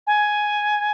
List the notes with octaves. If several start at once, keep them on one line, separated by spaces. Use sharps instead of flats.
G#5